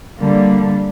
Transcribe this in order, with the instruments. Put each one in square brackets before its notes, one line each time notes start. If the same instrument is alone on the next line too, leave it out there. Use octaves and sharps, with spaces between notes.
[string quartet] D3 G3 A#3